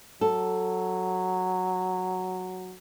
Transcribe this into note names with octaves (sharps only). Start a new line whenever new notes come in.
F#3 A4